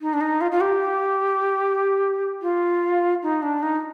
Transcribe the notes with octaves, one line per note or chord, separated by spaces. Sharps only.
D#4
D4
D#4
F4
F4
G4
F4
D#4
D4
D#4